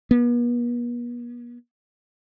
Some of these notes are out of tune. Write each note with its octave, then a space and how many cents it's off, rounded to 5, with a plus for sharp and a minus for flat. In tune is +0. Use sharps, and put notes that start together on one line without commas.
B3 -45